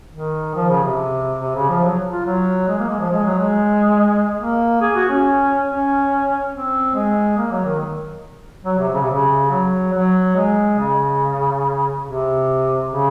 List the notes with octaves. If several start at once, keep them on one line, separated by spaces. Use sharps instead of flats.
D#3
F3
C#3
C3
C3
C#3
F3
F#3
F4
F#3
G#3
A#3
G#3
F3
G#3
F#3
G#3
A#3
G#4
F#4
C#4
C#4
C4
G#3
A#3
F#3
D#3
F#3
C3
C#3
C3
C#3
F#3
F#3
G#3
C#3
C3
C#3